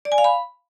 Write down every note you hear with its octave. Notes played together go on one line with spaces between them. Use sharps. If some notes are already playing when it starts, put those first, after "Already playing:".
D5
G#5
F5
B5